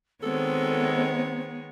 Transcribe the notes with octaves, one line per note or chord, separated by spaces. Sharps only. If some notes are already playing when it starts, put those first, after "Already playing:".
D#3 G#3 B3 C4 A4 C#5